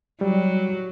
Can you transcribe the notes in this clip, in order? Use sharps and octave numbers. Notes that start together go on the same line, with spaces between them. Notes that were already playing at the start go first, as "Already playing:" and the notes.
F#3 G3